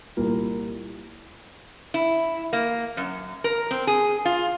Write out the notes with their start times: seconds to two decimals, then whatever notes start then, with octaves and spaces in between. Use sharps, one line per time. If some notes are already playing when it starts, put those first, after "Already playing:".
0.17 C2 A#2 A#4
1.94 E4
2.53 A#3
2.97 F#2
3.44 A#4
3.71 C4
3.87 G#4
4.25 F4